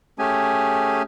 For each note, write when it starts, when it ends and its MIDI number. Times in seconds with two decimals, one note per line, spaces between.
0.19 1.02 57
0.19 1.02 61
0.19 1.02 67
0.19 1.02 68
0.19 1.02 80